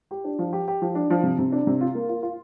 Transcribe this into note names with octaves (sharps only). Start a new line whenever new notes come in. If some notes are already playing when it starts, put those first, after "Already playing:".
G4
D4
F3
G4
G4
F3
D4
F3
C3
C3
D4
C3
F4
A#3
F4
F4